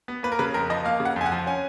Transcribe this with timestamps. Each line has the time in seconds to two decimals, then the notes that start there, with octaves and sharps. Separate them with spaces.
0.08 B3
0.23 A#3 B4
0.32 A#4
0.39 C#3 B4
0.54 F2 A#4
0.70 F3 D#5
0.85 A#3 F5
1.00 C#3
1.05 F#5
1.16 F2 G#5
1.26 F#5
1.32 F3
1.47 C#4 G#5